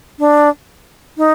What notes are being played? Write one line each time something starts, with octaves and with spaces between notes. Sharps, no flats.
D4
D#4